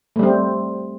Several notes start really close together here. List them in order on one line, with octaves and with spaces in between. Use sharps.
A3 G3 C4